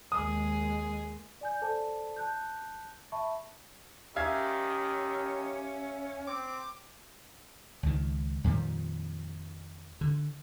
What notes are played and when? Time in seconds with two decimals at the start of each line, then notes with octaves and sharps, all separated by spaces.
0.12 D#2 G#3 G#4 D#6
1.41 D5 G#5 G6
1.62 A4 C5 D5 A5
2.17 A5 F#6 G6
3.12 E5 A5 B5 C#6
4.16 D#3 C#4 G4 E5 F5 G#6
6.27 C4 D6
7.83 C#2 D#3
8.44 F2 A#2 D#3 G3
10.01 D3